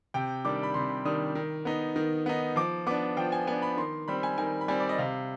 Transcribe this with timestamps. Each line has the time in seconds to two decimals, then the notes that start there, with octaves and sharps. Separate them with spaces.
0.14 C3 G5
0.45 D#3 G3 D4 D6
0.63 B5
0.74 C3 C6
1.05 D#3 G3 D4 D#6
1.35 D#3
1.65 B3 D#4
1.96 D#3
2.26 B3 D#4
2.56 F3 D6
2.87 B3 D4 D6
3.17 F3 G5
3.32 G#5
3.47 B3 D4 G#5
3.62 B5
3.77 D#3 C6
4.08 G3 C4 B5
4.23 G#5
4.38 D#3 G#5
4.61 B5
4.68 G3 C4 G#5
4.80 D5
4.89 D#5
4.98 C3 F5